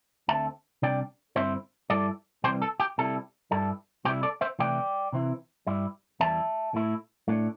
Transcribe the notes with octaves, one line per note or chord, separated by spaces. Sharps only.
D2 D3 C4 E5 A5
C2 C3 G3 D4 D5 G5
G2 D3 C4 E4 C5 E5
G2 G3 E4 A4 D5
C2 C3 E3 G3 G4 C5
A4
G4
C3 G3 E4 A4
G2 G3 E4 A4
C2 C3 G3 E4 G4 C5
A4 D5
C5 E5
C3 E3 A3 E4 D5 G5
C3 E3 C4 E4
G2 G3 E4
E2 E3 G3 E4 E5 A5
A2 A3 E4
A2 A3 D4